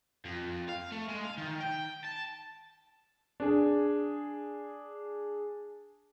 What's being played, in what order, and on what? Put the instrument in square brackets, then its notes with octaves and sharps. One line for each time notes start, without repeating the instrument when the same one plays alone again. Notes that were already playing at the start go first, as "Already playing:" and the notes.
[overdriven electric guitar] F2
F5
A3
G#3
F5
D#3
G5
A5
[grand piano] D4 G#4